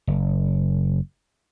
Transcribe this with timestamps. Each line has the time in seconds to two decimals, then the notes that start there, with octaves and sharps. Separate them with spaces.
0.07 F#1